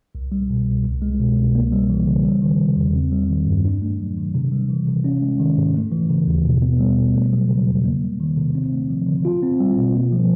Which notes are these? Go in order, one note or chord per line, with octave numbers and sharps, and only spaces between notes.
C2
G3
B2
C2
C2
G#3
B2
C2
A#3
G3
E3
C#3
G3
D#3
C3
E2
C4
G3
D#3
G2
D4
A3
F#3
D#3
C3
G3
E3
C3
C#4
G#3
D#3
G#2
A3
E3
C#3
D#2
B2
B3
G3
B2
A3
F#3
C#3
E2
A#3
G3
D#3
C3
C4
A3
F3
D3
F4
C4
G3
B2
A#3
F3